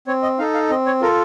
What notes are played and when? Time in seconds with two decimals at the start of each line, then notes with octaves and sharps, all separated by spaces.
0.07 C4 C#5
0.23 D#5
0.39 D#4 A4 F5
0.54 F5
0.70 C4 D#5
0.86 C#5
1.02 F4 A4 A#4